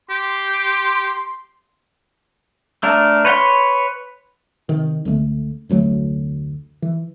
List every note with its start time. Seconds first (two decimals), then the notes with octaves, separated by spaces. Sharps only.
0.10 G4 C6
2.83 A3 D4 A#4
3.25 B4 C#5 F#5 B5 C6
4.69 C3 D#3
5.05 C#2 D3 G#3 A3
5.69 F1 D2 F#3 A3
6.82 E3